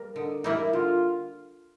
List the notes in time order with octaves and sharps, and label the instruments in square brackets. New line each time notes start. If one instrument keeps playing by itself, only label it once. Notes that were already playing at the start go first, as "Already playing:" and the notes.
Already playing: [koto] G3 A#3
[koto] D3 [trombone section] D#4
[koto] G3 A#3 D#4 [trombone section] E4
[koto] D3 [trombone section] F4